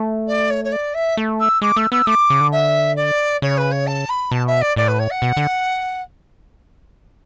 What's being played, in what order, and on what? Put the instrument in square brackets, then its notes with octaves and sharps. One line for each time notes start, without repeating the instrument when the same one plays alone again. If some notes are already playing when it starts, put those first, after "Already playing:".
Already playing: [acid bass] A3
[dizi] D5
C#5
C#5
D5
E5
[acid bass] A3
[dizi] E6
[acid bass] G#3 [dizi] D6
[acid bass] A3 [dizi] E6
[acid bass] B3 [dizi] E6
[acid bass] A3 [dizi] D6
[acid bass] C#3
D3
[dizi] E5
D5
[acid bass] C#3 [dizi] C#5
[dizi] B4
C#5
A5
B5
[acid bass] B2 [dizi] A5
[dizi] E5
D5
[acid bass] A2 [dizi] D5
[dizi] B4
C#5
F#5
[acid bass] B2
D3